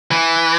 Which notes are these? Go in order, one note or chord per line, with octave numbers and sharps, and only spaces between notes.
E3